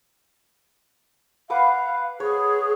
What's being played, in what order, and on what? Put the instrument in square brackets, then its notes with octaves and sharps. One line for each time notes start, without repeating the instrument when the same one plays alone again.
[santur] B4 F#5 D6 [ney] F5
[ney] G#4 [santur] C#5